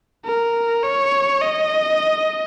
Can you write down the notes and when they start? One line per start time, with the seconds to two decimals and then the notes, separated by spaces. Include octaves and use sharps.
0.25 A#4
0.83 C#5
1.42 D#5